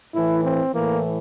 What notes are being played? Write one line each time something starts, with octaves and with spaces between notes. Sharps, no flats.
A2 E3 E4
C4
A2 E3 A#3